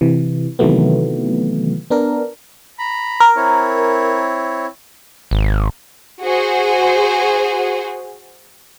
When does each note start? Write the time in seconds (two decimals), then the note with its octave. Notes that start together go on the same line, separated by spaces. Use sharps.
0.01 C3 E3
0.59 C3 D#3 E3 F#3 A3 B3
1.90 B3 D4 A#4
2.79 A#5 B5
3.20 A#4
3.36 C4 E4 C#5
5.31 G#1
6.23 F#4 G#4 C5